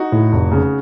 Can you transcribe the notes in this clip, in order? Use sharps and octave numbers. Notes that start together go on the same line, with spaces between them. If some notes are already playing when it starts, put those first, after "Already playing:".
Already playing: D#4 F#4
A2
F1
C#3